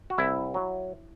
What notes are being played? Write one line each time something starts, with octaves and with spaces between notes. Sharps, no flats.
F#4
C2 E4
F#3